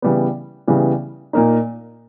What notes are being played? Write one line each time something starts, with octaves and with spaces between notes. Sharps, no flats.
C#3 E3 G3 B3
C#3 E3 G3 B3
A#2 A#3 D#4